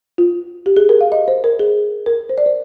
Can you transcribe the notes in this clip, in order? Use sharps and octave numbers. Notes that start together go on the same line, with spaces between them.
F4
G4
G#4
A#4
F5
D#5
C5
A#4
G#4
A#4
C5
D5
C5